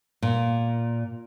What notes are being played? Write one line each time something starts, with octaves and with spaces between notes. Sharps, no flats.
A#2